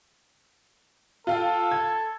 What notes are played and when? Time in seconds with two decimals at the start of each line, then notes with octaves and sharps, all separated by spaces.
1.27 F4 A4 F5 G5
1.71 G#6